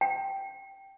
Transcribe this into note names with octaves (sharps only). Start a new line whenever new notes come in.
G5